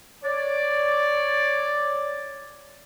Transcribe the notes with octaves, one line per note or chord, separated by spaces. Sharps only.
C#5 D5